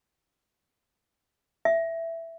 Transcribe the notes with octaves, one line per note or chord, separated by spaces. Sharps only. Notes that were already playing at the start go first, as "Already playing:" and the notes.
E5